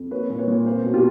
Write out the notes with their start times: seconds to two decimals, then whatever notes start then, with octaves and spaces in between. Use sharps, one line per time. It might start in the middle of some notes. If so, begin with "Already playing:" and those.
Already playing: F2
0.11 A#3 B4 C#5
0.30 A#2
0.39 B4 C#5
0.48 A#2
0.66 C4 A#4 C5
0.84 B2
0.94 F4 G4